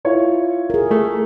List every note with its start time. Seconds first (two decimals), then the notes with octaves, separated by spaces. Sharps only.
0.05 E4 F4 C#5
0.70 G#4 A#4
0.91 A3